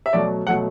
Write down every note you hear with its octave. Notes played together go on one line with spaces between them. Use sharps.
E5
B2 F#3 A3 D5
B2 F#3 A3 F#5